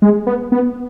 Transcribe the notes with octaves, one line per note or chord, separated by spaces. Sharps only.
G#3
B3
B3